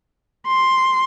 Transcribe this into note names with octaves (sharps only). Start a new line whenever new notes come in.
C6